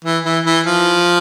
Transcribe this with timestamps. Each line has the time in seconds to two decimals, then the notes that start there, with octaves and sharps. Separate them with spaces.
0.04 E3
0.25 E3
0.45 E3
0.66 F3